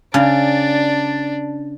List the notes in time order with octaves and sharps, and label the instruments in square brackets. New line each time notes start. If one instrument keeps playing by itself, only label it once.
[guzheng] C#3 [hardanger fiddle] D4 D5